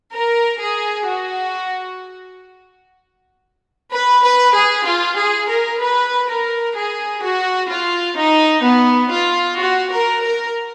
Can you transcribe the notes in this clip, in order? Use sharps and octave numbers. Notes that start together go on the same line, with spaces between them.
A#4
G#4
F#4
B4
B4
G#4
F4
G#4
A#4
B4
A#4
G#4
F#4
F4
D#4
B3
F4
F#4
A#4
A#4